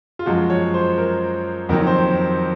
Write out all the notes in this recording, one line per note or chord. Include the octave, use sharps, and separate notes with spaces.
F4
F#2 F3 G#3 F#4
C#5
C5
A#4
F2 D#3 F#3 A#4
C5